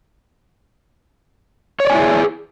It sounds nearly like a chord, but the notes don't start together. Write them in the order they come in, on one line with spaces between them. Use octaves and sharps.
C#5 D5 G#5 E4 G#4